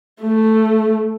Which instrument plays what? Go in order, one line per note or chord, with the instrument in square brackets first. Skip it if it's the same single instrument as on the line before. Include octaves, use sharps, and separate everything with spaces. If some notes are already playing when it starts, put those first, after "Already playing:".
[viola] A3